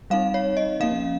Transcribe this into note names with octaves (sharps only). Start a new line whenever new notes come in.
G3 C4 D#4 F5
C#5
D#5
F3 A#3 C#4 F5